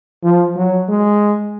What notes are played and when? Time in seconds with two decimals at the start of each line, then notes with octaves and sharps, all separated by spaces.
0.23 F3
0.56 F#3
0.89 G#3